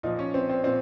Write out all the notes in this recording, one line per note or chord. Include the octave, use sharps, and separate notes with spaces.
A#2 F3 D#4
C#4
C4
C4
A#2 C4